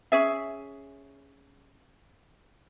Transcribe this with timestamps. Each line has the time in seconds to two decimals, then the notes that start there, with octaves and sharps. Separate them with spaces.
0.12 C#4 G#4 E5